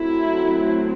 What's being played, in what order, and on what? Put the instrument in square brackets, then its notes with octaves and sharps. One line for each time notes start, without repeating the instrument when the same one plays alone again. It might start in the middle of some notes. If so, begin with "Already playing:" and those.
Already playing: [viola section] F#3 A3 C4 E4